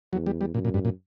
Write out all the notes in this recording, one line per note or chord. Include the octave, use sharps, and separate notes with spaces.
E2 F#3
G3
G3
F#2 A#2
A#2
G2
A#2